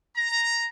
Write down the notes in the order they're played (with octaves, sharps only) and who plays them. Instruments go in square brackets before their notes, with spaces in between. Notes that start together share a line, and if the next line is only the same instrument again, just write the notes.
[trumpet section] A#5